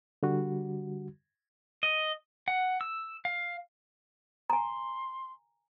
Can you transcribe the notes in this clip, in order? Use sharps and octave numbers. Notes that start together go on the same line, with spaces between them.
D3 G3 F#4
D#5
F#5
E6
F5
G#5 A#5 C6